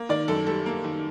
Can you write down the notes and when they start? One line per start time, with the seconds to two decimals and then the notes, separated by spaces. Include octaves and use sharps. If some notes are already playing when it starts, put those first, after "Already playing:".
Already playing: A#3
0.09 D#3 D5
0.28 F#2 A4
0.47 G3 A4
0.66 A#3
0.84 D#3